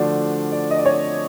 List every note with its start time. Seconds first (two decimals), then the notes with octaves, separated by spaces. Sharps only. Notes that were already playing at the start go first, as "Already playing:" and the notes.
Already playing: D3 F3 A3 D4 F#4 D5
0.52 D5
0.70 D#5
0.78 D5
0.85 C#5